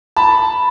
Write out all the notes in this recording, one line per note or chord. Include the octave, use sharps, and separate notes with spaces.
A5 B5